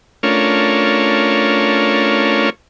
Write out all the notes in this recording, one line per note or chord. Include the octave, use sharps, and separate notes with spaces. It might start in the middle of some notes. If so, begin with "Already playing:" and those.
A3 C#4 D4 F4 A#4 C#5